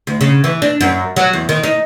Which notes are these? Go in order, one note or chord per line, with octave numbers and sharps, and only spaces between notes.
D2
C#3
E3
D4
F#2
F#3
E2
D#3
D#4